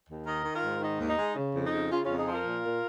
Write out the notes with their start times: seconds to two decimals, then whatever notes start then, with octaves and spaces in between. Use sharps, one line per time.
0.08 D#2
0.26 D#3 A#4 D#5
0.45 D#3
0.54 F4 A#4
0.62 G#2
0.81 D#3 D#4
1.00 D#2
1.08 D#4
1.18 G#3
1.36 C#3
1.54 F2
1.64 D#4
1.73 C#3
1.91 C#3 C#4 F4
2.04 F2 C#4 F4
2.18 D#4 G#4
2.28 F3 F4 A#4
2.45 A#2
2.65 A#2